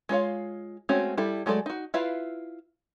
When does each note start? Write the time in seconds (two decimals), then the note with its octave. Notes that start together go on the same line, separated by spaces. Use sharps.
0.09 G#3 F4 C#5 F5
0.89 G#3 A3 C4 C#4 F#4
1.18 G3 E4 A4
1.46 F#3 G#3 A3 A4 D5
1.66 D#4 F#4
1.94 E4 F4 B4 E5 F5